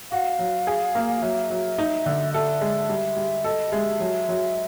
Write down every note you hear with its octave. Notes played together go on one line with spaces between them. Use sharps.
F#4 F5
F#3
G#4
A#3
F#3 E5
F#3
D#4
D3
A4 E5
G#3
G3
G3
A4 D#5
G#3 E5
F#3
F#3